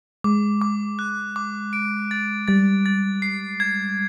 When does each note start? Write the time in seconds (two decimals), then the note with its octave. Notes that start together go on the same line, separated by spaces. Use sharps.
0.24 G#3 D6
0.61 D6
0.99 F#6
1.36 D6
1.73 D7
2.11 A6
2.48 G3 A6
2.86 A6
3.22 C7
3.60 G#6